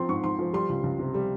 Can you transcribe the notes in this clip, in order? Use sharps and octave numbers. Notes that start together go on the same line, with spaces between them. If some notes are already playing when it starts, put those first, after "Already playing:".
Already playing: F3 C4 C6
G#2 C#6
G#2 C6
F3
G3 C6
C#2
C#2
C3
G3